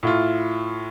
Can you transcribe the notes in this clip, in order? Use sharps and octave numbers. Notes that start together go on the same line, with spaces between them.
A2 E4 F4